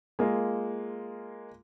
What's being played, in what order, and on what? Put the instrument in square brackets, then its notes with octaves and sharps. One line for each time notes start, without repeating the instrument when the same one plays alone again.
[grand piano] G#3 A#3 F4